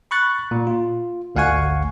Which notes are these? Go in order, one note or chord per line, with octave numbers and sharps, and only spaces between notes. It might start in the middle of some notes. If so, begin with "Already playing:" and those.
B5 C#6 F#6 A6
A#2
F4
G#1 D2 F5 F#5 G#5 C#6